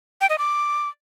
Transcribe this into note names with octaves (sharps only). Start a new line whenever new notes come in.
G5
D#5
D6